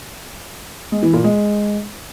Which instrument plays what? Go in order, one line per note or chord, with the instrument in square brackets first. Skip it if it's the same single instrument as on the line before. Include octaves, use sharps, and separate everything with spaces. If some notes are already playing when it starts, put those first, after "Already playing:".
[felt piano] G#3
E3
A#2
G#3